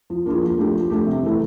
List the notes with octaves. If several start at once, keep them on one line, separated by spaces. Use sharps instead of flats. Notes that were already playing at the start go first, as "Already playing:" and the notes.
F3
A#3 D4 F4 G#4
F3
A3 D4 G4
F3
A3 D4 G4
C3
E3 A3